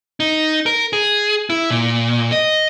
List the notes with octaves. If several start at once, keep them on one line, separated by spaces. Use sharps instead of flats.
D#4
A#4
G#4
E4
A#2
D#5